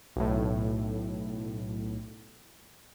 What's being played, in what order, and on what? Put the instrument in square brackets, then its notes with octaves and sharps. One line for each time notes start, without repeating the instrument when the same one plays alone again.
[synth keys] B1 A2